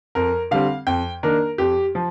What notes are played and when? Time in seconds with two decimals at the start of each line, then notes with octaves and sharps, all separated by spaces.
0.15 F2 A#4
0.51 D3 G3 C4 F5
0.87 F2 G5
1.23 D#3 A#3 D4 A#4
1.58 F2 G4
1.95 F3